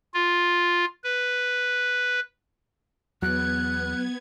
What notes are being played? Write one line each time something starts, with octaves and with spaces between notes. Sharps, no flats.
F4
B4
E2 F#3 B3 F#6 G#6